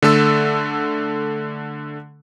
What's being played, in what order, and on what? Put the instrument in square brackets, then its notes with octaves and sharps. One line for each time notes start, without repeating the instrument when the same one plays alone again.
[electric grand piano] D3 A3 A4 E6